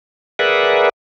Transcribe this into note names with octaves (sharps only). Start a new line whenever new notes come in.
G#4 A#4 B4 D5 E5 F#5